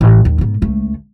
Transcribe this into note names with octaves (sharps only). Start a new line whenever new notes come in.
A1
D#2
G#2 B2
C#2 A3